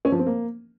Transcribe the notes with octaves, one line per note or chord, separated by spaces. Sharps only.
C#4
F3
C4
A#3